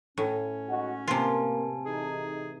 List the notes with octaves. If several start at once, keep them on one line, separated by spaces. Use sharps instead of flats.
A2 C#4
G#3 D#4 F#4
C3 A#3 F4 B4 G#5 A5
E3 A3 D#4 G#4